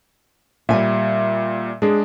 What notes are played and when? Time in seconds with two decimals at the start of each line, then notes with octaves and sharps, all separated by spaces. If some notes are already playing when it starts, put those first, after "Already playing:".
0.69 A#2 G3 E5 G#5
1.82 G#3 D4 G#4